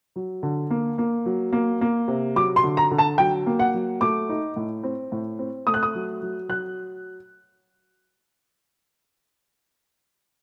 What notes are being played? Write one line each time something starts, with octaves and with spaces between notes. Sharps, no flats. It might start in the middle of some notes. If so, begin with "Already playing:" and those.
F#3
D3
A#3
A#3
F#3
A#3
A#3
C3
F#3 D6
C6
D3
A#5
D3
A5
F#3 G5
A#3
F#5
F#3
A3 D6
D#4
A2
C4
A2
C4
A3 D#6
F#6
D#6
F#3
F#3
F#3 F#6